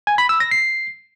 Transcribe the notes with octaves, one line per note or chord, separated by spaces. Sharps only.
G#5
B5
E6
A#6
C7